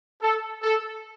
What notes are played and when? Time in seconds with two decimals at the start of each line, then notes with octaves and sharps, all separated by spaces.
0.22 A4
0.63 A4